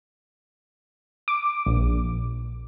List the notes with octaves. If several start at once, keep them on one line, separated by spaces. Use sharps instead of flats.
D6
A#1